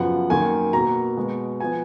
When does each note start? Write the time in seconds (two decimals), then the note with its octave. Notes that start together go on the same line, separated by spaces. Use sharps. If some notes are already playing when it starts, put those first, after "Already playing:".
Already playing: F#2 C#3 F3 B3 F#5
0.30 F#2 D#3 A#3 G#5
0.73 B2 A#3 A#5
1.17 B2 G#3 B3
1.60 F3 B3 G#5